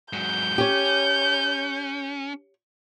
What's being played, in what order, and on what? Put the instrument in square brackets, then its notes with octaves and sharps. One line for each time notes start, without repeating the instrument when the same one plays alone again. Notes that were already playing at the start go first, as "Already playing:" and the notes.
[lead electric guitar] G#2 F#3 [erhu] G6
[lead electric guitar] C#4 [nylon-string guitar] G4 C#5